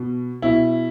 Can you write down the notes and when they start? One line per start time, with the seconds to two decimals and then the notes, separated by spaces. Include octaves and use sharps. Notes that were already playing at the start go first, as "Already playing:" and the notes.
Already playing: B2
0.42 B2 E4